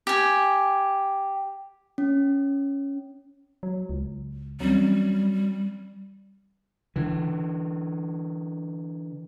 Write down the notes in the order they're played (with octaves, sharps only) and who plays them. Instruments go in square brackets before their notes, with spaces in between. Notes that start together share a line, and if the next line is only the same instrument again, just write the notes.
[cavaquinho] G4 G#5
[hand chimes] C#4
[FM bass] F#3
C#2
[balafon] E3 C4 C#4 [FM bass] F#3 [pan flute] G3
[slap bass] D3 E3